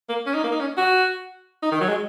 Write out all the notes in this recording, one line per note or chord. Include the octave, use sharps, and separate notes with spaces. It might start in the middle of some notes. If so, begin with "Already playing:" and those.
A#3
C#4
D#4
A#3
D#4
C#4
F#4
D#4
D#3
F#3
G#3